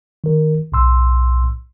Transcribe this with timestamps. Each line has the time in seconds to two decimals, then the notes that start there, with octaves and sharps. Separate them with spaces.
0.24 D#3 A#4
0.72 B1 A2 C6 E6